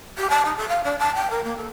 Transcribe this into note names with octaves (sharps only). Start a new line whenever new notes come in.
G4
A5
D#4
A4
F5
D4
A5
G5
A#4
A#3
A4